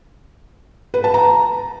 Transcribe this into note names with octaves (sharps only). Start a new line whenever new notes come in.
B4
A5
A#5